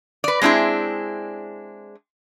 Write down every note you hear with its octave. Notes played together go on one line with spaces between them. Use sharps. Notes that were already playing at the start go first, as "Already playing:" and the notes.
B4 D5
G#3 C4 D4 E4 G#4